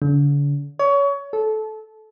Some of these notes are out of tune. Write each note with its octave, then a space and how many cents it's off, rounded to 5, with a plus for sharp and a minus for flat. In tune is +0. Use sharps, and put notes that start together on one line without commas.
D3 -40
C#5 +25
A4 -20